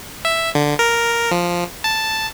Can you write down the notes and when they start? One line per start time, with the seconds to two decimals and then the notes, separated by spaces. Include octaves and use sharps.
0.25 E5
0.55 D3
0.79 A#4
1.31 F3
1.84 A5